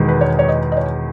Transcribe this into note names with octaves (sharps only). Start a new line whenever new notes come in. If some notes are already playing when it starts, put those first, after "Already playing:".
Already playing: E1 E2 D#3 G#3
B4
C#5
C#5
D#5
D#5
C#5